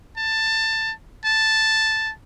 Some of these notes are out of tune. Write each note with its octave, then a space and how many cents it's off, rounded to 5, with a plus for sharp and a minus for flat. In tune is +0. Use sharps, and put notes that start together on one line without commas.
A5 +15
A5 +0